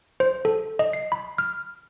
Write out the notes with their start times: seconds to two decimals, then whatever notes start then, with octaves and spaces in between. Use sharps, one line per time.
0.20 C5
0.45 A4
0.79 D#5
0.93 C7
1.12 B5
1.38 F6